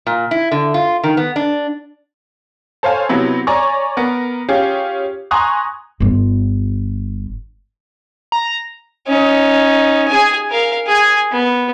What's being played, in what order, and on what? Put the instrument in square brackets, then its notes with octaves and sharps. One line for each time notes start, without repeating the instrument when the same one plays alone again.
[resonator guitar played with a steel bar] A#2
E4
D3
F4
D#3
B3
D4
[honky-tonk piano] A4 C5 C#5 F5 G#5
C3 F#3 B3 E4
C#5 D5 G#5 A#5 C#6
B3 A#4
C#4 F4 G4 G#4
G#5 A#5 C6 C#6 D#6 F#6
[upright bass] G1 F4
[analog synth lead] A#5
[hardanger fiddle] C#4 D#4
G#4 G#5
A#4 F5
G#4 G#5
B3